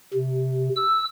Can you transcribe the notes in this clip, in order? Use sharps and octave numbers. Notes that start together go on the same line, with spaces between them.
C3
E6